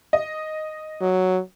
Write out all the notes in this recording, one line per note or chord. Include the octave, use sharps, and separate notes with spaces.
D#5
F#3